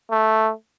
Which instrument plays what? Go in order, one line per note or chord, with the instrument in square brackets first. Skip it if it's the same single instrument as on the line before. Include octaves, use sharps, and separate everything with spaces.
[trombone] A3